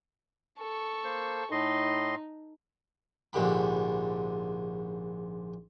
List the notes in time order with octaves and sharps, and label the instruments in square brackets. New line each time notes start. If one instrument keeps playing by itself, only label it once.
[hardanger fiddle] A4 C#6
[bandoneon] A#3 C5
[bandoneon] A2 D#5 C6 [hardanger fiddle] D#4
[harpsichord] A#1 G#2 D3 G4 B5